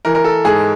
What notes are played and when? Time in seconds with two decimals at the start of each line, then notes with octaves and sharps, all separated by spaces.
0.05 E3 A#4
0.15 A#4
0.24 A4
0.44 G#2 G#4